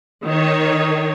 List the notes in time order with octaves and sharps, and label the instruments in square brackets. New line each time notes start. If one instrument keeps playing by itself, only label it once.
[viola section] D#3 C#5